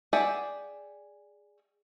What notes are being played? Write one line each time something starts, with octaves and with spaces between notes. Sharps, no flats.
G#4 D5 E5 F#5 G5